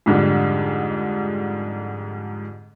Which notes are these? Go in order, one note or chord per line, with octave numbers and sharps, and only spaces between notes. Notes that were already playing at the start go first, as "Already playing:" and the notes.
F2 G#2 D3 G3